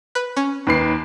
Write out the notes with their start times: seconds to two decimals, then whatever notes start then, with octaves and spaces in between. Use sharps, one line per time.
0.15 B4
0.37 C#4
0.67 D#2 B4 C7